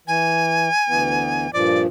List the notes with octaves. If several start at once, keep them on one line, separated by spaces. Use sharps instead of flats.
E3 G#5
D2 E3 B3
G2 A#2 F3 D5